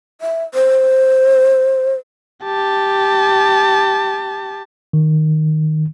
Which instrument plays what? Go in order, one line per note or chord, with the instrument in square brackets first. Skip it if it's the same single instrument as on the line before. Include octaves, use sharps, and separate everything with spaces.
[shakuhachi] E5
C5
[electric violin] G4 A5
[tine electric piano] D#3